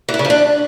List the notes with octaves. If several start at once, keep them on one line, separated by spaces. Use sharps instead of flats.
E3
E4
C#3
F3
D4